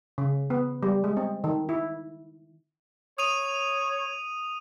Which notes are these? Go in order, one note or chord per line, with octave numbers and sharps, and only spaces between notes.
C#3
B3
G3
G#3
C4
D#3
E4
C#5 D#6 D#7 F7